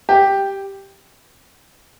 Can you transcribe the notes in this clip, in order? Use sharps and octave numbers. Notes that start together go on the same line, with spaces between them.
G4